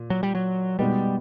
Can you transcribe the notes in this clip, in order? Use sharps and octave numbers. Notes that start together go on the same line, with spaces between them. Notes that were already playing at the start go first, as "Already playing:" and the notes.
Already playing: A#2
F#3
G3
F#3
B2 G3 G#3 B3 D#4